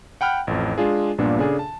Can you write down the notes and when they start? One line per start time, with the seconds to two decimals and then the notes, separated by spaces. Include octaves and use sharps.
0.21 F#5 G5 B5 F6 F#6
0.47 A1 F2
0.78 G#3 D4 F4 G#4
1.18 A#1 G2 A#2 A#3 B3 D4
1.39 C#3 D4 G#4 A4
1.59 A5